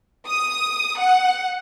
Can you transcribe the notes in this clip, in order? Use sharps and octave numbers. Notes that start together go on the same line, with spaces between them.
D#6
F#5